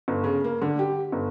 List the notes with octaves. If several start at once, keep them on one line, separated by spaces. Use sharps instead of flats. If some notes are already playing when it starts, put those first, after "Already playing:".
G1
C#3
A#3
D3
G4
G1